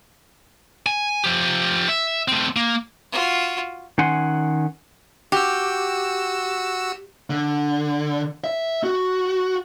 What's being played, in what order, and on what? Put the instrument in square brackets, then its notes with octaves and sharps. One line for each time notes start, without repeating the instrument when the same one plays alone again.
[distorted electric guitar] G#5
F3 G4
E5
A3 C4
A#3
[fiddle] F4 F#4
[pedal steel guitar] D#3 C#4 F#5 G#5 C6
[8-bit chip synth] F#4 E6 [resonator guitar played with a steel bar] G4
[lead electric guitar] D3
E5
F#4